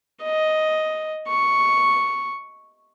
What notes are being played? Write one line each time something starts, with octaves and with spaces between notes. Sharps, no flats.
D#5
C#6